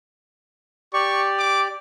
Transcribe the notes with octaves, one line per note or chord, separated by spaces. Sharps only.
G4 D5 C#6
D6